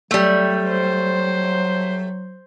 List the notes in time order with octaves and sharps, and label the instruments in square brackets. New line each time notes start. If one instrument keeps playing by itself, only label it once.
[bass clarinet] F#3 [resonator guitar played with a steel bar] G3 A3
[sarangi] C5